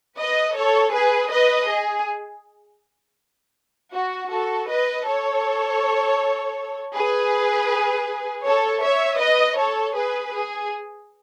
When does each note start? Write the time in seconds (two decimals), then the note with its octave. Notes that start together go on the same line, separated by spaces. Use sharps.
0.19 B4 D#5
0.56 A4 C#5
0.93 G#4 B4
1.31 B4 D#5
1.69 G#4
3.93 F#4
4.31 F#4 A4
4.69 B4 D#5
5.06 A4 C#5
6.95 G#4 B4
8.44 A4 C#5
8.82 C#5 E5
9.19 B4 D#5
9.57 A4 C#5
9.95 G#4 B4
10.33 G#4